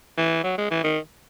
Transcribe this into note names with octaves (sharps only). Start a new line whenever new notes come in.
E3
F#3
G#3
E3
D#3